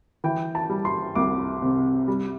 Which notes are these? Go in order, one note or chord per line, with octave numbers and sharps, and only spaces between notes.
E3 G5
A5
G3
C6
C2 D6
C3
G3